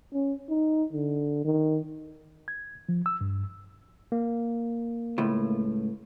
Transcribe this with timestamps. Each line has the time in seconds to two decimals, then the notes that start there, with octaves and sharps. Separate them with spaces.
0.14 C#4
0.49 D#4
0.93 D3
1.44 D#3
2.48 G#6
2.89 F3
3.06 E6
3.21 G2
4.12 A#3
5.18 C#2 A2